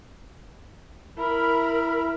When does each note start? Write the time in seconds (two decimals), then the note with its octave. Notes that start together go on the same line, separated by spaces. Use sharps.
1.18 E4 A#4 B5 F6